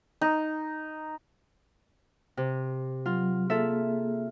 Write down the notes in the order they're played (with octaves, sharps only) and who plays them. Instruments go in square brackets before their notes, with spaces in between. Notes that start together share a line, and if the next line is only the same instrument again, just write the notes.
[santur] D#4
[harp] C3
[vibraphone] F#3 [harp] F4
[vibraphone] A#3 G#4 [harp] F4 A4 E5